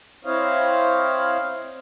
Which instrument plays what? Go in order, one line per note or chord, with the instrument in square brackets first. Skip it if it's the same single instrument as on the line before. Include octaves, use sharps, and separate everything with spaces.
[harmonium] C4 E4 C5 C#5 D#5 F5